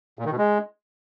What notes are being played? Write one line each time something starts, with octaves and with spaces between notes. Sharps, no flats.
A#2
D#3
B2
G#3